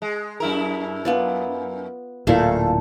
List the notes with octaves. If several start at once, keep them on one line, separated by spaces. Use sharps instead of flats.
G#3
F#2 E4 A#4
B3 F4 D5
D1 A#2 A3 E4 A4 F5